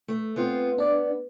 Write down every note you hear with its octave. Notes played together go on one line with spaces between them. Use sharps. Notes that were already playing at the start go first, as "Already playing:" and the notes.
A3
B3 C4 F4
B3 D4 D5